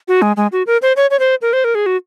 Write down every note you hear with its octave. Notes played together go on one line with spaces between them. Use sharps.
F#4
G#3
G#3
F#4
A#4
C5
C#5
C#5
C5
A#4
C5
A#4
G#4
F#4